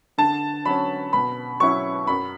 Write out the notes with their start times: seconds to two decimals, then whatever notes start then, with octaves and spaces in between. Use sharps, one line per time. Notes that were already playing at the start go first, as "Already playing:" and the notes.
0.18 D3 A5
0.65 F#3 C#4 B5
1.13 B2 B5
1.60 F#3 C#4 E4 C#6
2.07 F#2 B5